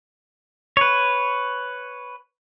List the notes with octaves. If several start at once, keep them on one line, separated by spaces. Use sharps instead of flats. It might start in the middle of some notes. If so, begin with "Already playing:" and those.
B4 C#5